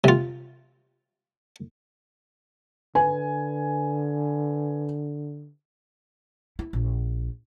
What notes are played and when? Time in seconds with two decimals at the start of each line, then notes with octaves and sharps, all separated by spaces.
0.04 C3 F4
2.95 D3 B4 G#5
6.59 E4
6.73 A#1